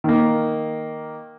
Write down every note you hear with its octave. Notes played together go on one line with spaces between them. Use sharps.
D#3 A#3